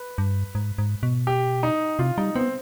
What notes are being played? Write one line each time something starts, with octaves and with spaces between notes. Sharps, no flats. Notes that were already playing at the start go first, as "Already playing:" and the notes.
Already playing: B4
G2
G#2
G#2
B2
G4
D#4
C3 F4
G3 D#4
B3 C4